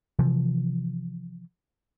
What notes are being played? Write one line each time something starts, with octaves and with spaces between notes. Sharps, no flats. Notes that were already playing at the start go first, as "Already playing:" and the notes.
C3 E3 F3